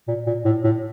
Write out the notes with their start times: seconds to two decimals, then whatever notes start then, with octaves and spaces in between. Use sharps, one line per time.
0.08 A#2
0.27 A#2
0.45 A2
0.64 A2